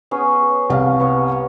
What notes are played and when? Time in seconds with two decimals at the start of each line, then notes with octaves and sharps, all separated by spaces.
0.11 B3 C#4 G#4
0.70 C2 G4 F5
1.00 B3 C#5